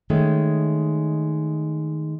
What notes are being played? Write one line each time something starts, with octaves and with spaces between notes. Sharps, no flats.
D#3 G#3 A3 C#4